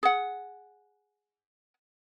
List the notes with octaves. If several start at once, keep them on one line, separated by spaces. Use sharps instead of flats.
G#4 F#5